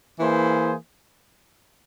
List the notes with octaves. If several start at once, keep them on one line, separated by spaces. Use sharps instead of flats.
E3 A#3 E4 G#4 C5